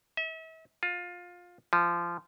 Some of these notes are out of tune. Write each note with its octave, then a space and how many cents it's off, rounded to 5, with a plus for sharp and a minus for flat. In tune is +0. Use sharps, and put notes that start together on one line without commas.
E5 -40
F4 +20
F3 -20